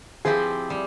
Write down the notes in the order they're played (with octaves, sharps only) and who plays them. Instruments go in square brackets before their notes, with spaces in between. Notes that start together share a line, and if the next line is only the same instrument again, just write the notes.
[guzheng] F3 C4 E4 G4 [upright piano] G#4
[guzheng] G3